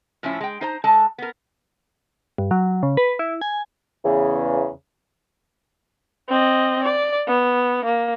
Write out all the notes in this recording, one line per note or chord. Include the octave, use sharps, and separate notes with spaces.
A2 F3 C#4 E4
G#3 G5
D#4 C5 A#5
G#3 A4 A5
B3 A#4
G2
F#3
C#3
B4
E4
G#5
E2 C#3
C4 D#5
D5
B3
A#3